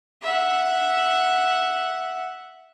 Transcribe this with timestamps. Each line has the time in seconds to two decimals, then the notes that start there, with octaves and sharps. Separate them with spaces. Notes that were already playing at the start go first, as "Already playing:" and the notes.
0.22 E5 F#5